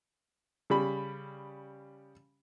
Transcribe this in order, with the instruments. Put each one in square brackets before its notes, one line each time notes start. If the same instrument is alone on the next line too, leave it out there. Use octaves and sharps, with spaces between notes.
[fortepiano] C#3 G3 B5